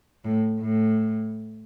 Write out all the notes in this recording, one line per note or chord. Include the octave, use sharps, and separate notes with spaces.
A2
A2